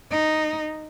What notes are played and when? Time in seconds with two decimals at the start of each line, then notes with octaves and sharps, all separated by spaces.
0.11 D#4